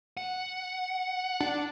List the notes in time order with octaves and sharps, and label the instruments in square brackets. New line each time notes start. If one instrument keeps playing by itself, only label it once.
[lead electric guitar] F#5
[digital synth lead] D4